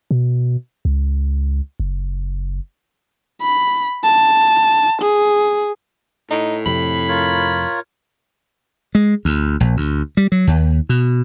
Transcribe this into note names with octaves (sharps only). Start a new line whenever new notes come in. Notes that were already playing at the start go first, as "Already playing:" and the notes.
B2
C#2
F#1
B5
A5
G#4
A2 D#4
F2 C3 B5
F4 A#4 C#5
G#3
D2
A#1
D2
G3
F#3
D#2
B2